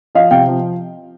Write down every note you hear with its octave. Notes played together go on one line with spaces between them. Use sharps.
F3 D#5 F5
C3 F5 G5
F3